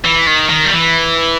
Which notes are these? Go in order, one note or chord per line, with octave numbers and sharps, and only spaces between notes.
E3
D#3
D#3
G3
E3